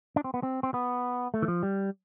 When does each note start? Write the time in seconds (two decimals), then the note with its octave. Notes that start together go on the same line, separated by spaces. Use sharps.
0.16 D4
0.24 C4
0.34 B3
0.43 C4
0.63 C4
0.74 B3
1.34 A3
1.42 E3
1.48 F3
1.63 G3